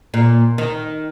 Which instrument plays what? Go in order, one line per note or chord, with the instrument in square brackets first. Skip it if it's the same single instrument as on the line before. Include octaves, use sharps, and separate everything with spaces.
[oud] A#2
D#3